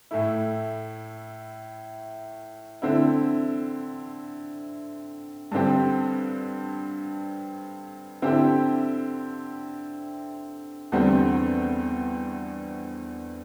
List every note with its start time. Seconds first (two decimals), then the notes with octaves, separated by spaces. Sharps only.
0.11 A2 A3 E4
2.82 D3 C4 E4
5.51 G2 D3 C4 G4
8.22 D3 C4 E4 G4
10.92 E2 D3 G3 C4